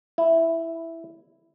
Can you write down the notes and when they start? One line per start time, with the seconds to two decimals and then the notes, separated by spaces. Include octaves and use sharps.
0.18 E4